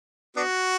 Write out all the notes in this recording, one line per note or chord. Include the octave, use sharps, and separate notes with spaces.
B3 D4 F#4